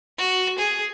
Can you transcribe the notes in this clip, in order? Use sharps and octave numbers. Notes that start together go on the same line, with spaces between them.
F#4
G#4